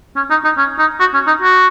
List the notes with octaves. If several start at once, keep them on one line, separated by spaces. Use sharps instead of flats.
C#4
D#4
D#4
C#4
D#4
F#4
C#4
D#4
F#4